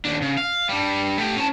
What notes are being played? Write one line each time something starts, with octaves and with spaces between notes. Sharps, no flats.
D#2 D4
C#3
F5
G3 D4
A3 G4
C#4 A5